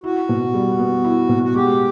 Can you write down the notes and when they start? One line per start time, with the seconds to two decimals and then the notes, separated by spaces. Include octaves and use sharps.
0.04 E4 F#4
0.29 B2
0.54 G3
0.79 B3
1.05 E4
1.29 B2
1.43 F#4
1.55 G#3 G4